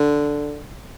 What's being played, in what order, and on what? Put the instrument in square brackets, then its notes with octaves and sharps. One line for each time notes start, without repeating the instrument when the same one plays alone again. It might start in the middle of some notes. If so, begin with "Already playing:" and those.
Already playing: [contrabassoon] D3